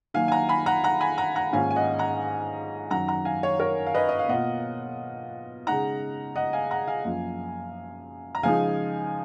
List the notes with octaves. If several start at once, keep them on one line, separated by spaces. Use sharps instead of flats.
D#3 F#3 A#3 F5 G#5
G#5
F#5 A#5
G#5 B5
F#5 A#5
F#5 A#5
G#5 B5
F#5 A#5
F#5 A#5
G#2 D#3 A#3 C#4 F4 F5 G#5
G#5
D#5 F#5
F#5 A#5
F#2 D#3 F#3 F#5 A#5
F#5 A#5
F5 G#5
C#5 F5
A#4 C#5
F5
B4 D#5
D#5
F5
B2 A#3 F4 D#5 F#5
C#3 G#3 D#4 F#5 A#5
D#5 F#5
F5 G#5
F#5 A#5
F5 G#5
F#2 F3 A#3 F4
A#5
C#3 F3 G#3 D#4 F5 G#5